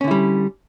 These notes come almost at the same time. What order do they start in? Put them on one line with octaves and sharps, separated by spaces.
C#4 D3 E4 G3